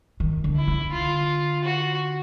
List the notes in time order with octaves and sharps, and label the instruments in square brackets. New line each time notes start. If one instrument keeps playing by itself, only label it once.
[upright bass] D#3
D3
[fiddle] E4
[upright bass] D3
[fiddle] F4
F#4